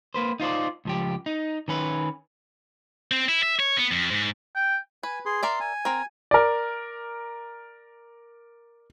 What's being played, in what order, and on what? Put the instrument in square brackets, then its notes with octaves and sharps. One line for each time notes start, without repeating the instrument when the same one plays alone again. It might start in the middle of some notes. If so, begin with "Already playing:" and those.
[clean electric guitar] A#3 B4 C5
D#4 F4 C5 D5
C#2 F3 G4
D#4
D#3 C#4 B4
[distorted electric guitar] C4
E4
E5
C#5
B3
F2
G#2
[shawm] G5
[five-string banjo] B4 [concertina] G#5
[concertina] G#4 C6
[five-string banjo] A#4 D5 E5 [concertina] C6
[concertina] G#5
[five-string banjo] C4 A#4
[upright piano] A#4 D5